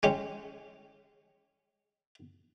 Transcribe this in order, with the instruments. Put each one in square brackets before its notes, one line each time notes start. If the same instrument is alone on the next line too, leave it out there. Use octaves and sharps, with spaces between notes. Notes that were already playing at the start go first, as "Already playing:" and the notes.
[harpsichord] G#3 C#4 G4